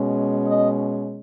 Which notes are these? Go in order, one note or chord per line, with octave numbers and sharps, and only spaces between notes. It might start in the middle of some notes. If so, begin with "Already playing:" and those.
Already playing: B2 G#3 C#4
D#5